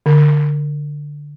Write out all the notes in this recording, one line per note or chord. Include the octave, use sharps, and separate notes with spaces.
D3